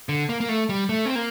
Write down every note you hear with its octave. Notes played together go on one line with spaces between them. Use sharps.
D3
A#3
A#3
A3
G3
A3
C4
A#3